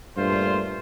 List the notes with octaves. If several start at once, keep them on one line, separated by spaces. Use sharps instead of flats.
G2 A#2 A3 F4 C5